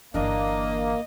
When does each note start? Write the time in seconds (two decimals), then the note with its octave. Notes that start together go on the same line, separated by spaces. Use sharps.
0.14 G1 E3 A#3 D4 A#4 D#5